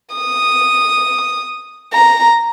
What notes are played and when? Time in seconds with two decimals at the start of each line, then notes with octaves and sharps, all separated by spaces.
0.15 D#6
1.93 A#5